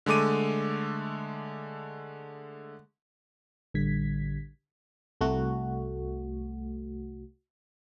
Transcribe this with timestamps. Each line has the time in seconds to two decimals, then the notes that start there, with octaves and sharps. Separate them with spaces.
0.06 D3 G#3 A3 D6 D#7
3.74 A1 D3 G3 G#6 B6
5.21 C2 A3 F#4